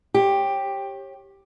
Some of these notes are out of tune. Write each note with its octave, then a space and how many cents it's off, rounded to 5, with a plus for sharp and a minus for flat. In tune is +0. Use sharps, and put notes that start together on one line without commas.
G4 +5 C#5 -30